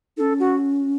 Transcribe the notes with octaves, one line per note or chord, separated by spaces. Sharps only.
C#4 D#4 A4
F#4